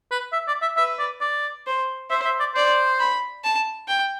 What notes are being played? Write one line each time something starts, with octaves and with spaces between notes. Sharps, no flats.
B4
E5
D5
E5
B4 E5
D5
D5
C5
C5 E5
E5
D5
C5 D5
B5
A5
G5